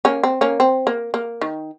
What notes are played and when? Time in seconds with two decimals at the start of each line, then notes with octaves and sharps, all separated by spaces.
0.05 A#3 C#4
0.23 C4
0.41 A#3 C#4
0.60 C4
0.87 A#3
1.14 A#3
1.41 D#3